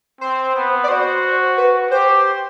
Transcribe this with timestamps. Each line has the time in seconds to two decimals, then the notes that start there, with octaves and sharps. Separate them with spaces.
0.21 C4 C5
0.55 B3
0.84 D5
0.88 F#4 C5
1.58 B4
1.91 G4 C5